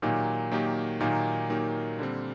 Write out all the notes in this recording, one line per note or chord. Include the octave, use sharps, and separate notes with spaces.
A#2 D#3 F#3 A#3 D#4 G4
D#3 F#3 A#3 D#4 G4
A#2 D#3 F#3 A#3 D#4 G4
D#3 F#3 A#3 D#4 G4
D3 G3 C4